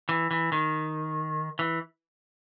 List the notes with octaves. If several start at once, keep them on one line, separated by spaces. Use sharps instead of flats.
E3
E3
D#3
E3